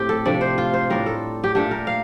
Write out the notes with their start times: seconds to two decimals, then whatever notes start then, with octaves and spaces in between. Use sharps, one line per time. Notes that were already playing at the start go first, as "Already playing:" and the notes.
Already playing: A2 A3 C4 G4
0.09 A4
0.25 C3 F3 A3 D4 D5
0.41 C5
0.58 F4
0.74 C5
0.90 A2 G3 D4 A#4
1.06 A4
1.44 G4
1.55 A#2 A3 D4 G4
1.71 A#4
1.87 F5